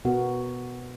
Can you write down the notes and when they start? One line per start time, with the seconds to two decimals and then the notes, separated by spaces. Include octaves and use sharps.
0.05 B2 B3 F#4 A#4